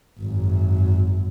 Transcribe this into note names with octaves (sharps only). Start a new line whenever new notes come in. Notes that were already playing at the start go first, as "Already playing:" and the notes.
G#1 F#2